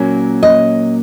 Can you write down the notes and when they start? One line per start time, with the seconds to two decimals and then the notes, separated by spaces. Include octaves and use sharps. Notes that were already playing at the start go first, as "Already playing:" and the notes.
Already playing: A#2 F#3 A#3 C#4
0.43 D#5